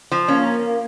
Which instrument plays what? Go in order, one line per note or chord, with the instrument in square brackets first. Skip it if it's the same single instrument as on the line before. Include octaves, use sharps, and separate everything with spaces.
[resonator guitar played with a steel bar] F3
[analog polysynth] A#3 [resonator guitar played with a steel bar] C#4